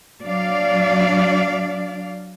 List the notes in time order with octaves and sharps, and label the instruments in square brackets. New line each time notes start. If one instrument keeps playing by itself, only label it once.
[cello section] F#3 D4 D5 F5